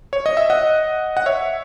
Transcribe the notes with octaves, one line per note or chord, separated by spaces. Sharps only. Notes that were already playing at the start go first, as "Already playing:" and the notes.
C#5
D#5
E5
D#5 F#5
F#5
C#5 E5